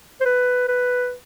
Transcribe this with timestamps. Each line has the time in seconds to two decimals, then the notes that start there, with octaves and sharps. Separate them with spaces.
0.20 C5
0.25 B4
0.68 B4